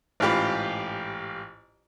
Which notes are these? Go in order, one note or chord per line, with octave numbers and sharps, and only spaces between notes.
A1 G#2 F4 G4 B5